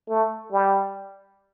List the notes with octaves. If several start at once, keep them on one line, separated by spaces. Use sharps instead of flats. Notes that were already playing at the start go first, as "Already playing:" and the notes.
A3
G3